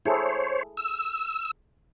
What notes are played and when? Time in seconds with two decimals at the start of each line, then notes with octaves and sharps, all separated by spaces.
0.06 E4 G#4 A4 C5 C#5
0.77 E6